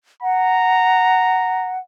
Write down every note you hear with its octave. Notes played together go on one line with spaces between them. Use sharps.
F#5 A#5